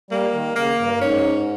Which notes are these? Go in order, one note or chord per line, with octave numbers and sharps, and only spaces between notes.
G3 A#3
D#3
C#3 A#3
G2
G2
G#2 C#4